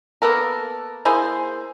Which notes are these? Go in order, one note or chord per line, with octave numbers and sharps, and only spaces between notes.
A#3 B3 A4 A#4
A#3 E4 G#4 C5